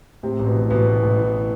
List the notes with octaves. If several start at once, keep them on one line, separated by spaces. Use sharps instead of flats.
A2 C3 C4
A1
B2 B3
E3
A1 B2 B3
A2
A1
E3